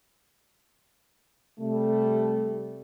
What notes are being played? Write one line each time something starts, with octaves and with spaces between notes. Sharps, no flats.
C3 G3 A3